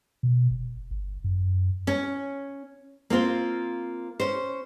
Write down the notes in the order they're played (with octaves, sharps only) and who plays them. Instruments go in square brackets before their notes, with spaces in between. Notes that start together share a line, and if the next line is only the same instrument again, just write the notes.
[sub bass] B2
F1
G1
F#2
[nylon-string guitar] C#4
A#3 C4 F4 C5
C#4 C5